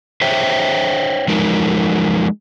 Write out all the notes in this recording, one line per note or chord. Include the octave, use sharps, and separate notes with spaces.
C5 C#5 E5 G5
F3 F#3 G#3 D#4 A#4